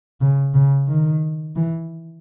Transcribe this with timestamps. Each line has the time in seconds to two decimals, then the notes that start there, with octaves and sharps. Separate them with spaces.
0.21 C#3
0.54 C#3
0.88 D#3
1.56 E3